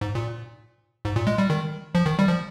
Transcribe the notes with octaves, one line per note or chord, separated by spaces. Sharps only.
G#2
A#2
G#2
A#2
G#3
G3
D#3
F3
D#3
G3
F3